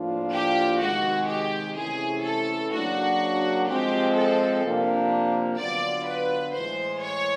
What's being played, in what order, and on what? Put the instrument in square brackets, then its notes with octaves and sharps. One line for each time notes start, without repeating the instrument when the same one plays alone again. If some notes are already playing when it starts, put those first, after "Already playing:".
Already playing: [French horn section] A2 F3 A#3 D4 F4
[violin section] G4
[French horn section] C3 D#3 G#3 [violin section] F#4
[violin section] G4
[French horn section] C3 E3 A3 C#4 E4 [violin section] G#4
[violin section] A4
[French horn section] C#3 F#3 A#3 D4 [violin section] F#4
[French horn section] F3 G#3 C4 [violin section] G4
[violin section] A4
[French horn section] C3 F3 A#3 D4
[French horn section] D3 F#3 B3 D4 F4 [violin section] D5
[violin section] B4
[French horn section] A2 E3 G#3 [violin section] C5
[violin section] C#5